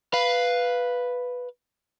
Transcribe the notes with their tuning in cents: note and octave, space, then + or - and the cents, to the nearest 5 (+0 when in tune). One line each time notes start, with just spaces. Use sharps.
B4 +0 F5 +0